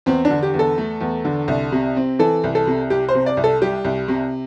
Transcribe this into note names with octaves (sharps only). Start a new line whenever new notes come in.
E2 C4
D4
D3
G4
E2
A4
A3
E2
D3
C2
C3
C4
E3 A4
C2
A4
C3
C2 G4
C5
C3
D5
C2
A4
G3 G4
C2
C3